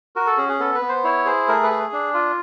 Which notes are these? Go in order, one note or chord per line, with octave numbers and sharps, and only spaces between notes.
F#4 A#4
A4
C#4 G#4
G#4
B3 A4
B4
B3
C5
E4 C#5
G#4 C5
A3 A#4
B4
G#4
D4
F4